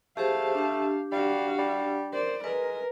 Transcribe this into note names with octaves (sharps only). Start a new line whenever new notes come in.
A3 G4 G#4 C5 F5 A5
D4 G4
G3 F#4 F5
G3
A#4 C5 D5
G#3 A#4 B4